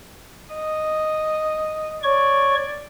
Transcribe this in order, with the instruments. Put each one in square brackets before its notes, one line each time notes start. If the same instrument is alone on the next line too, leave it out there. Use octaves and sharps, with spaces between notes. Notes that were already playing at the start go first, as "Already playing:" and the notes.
[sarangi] D#5
[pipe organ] C#5 C#6 [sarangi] D5